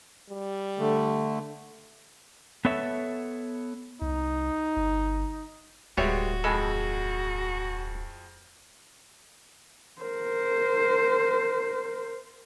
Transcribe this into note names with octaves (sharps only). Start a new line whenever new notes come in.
G3
D3 A3
B3 A4 C#5 E5
C2 D#4
G1
D1 G3 G#3 B3 F#4 C#5 E5
F2 G#3 G#4 A4 B5
A#4 C5